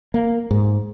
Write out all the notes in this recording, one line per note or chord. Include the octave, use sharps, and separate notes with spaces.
A#3
G#2